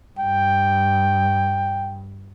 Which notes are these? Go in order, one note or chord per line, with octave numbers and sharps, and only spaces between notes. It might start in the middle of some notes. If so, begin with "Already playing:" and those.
G2 G5